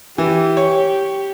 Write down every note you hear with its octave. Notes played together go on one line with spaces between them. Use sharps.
E3 G4
C#5